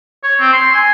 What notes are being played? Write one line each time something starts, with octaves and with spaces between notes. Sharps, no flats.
C#5
C4
C6
G#5